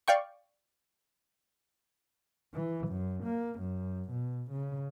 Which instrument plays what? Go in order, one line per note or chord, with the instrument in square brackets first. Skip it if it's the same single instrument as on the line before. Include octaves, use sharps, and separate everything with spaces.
[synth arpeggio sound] D5 F5 G5 C#6
[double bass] E3
F#2
A#3
F#2
B2
C#3